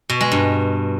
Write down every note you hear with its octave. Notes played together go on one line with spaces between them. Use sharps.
B2
G#3
G2